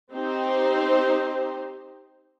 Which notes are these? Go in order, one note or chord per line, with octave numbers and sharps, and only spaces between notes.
C4 D#4 G4 C5